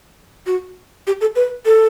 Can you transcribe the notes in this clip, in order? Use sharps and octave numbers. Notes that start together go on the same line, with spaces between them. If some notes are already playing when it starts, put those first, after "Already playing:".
F#4
G4
A4
B4
A4